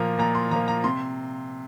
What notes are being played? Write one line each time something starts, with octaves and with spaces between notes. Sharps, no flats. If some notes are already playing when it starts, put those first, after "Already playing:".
Already playing: A#2 F3 A#3 A#5
A#2 A#5
C6
F3 A#3 A#5
A#5
C3 C6